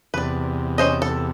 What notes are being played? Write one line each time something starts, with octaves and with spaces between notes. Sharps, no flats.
E2 C3 B4 D5
C#4 C5 D#5
A4